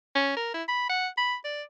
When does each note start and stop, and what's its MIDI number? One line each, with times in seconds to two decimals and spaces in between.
0.15 0.37 61
0.37 0.50 70
0.54 0.63 64
0.68 0.89 83
0.90 1.08 78
1.18 1.36 83
1.45 1.63 74